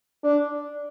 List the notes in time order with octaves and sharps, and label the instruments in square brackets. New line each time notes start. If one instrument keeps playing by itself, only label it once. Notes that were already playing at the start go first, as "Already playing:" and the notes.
[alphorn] D4